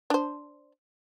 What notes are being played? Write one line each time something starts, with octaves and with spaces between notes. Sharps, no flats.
D4 C5